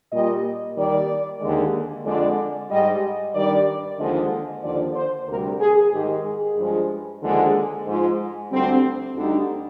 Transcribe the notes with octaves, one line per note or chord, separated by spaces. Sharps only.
A#2 G3 D#5
D#2 D#3 G3 D5
D#2 D3 G#3
F2 D3 G#3 D5
G#2 G3 D#5
G2 D#3 G3 D5
D#2 D3 F3 G#3 D#5
D#2 D3 F3 D5
C5
D2 C3 G3 A#4
G#4
G#2 D#3 G#3 G4
G#4
G2 F3 G#3
D#2 D3 F3 G#3
G#2 F3 G#3 F4
D2 D3 G3 C4
D2 D3 G3 D#4